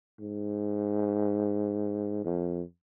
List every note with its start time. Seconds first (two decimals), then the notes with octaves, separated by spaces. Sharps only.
0.20 G#2
2.24 F2